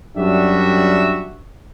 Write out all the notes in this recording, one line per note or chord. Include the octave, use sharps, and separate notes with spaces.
F#2 G3 D4 F#4 E5